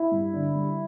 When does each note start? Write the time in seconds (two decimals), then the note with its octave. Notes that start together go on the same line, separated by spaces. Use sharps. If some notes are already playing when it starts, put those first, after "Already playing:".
Already playing: E4
0.11 G2
0.33 D3
0.55 G3